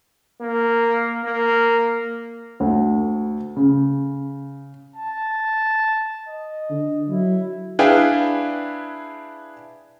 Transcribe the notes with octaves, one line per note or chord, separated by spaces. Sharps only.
A#3
A#3
D2
C#3
A5
D#5
D3
F#3 E4
D4 E4 G#4 B4 F5 G5